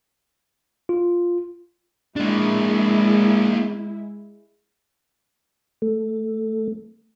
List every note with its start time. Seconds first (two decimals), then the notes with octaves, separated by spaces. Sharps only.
0.89 F4
2.16 G#3 A#3 D4 E4
5.82 A3